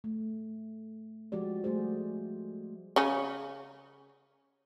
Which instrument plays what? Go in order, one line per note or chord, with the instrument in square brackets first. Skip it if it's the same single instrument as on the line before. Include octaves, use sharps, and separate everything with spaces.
[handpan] A3
F3 G#3 F#4 G4 D5
G3 A3 F#4 G#4 C5
[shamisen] C#3 C#4